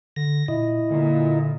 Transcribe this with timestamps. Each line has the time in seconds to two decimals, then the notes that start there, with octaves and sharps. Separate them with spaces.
0.16 D3 A#6
0.48 A#2 E4 D#5
0.91 A#2 D3